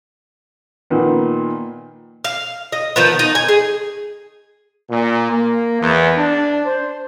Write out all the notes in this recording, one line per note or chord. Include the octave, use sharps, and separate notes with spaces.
A#2 D#3 F3 A#3 B3
F5
D#5
D#3 F3 B3
D#4
G#5
G#4
A#2
A#3
E2
D4
C5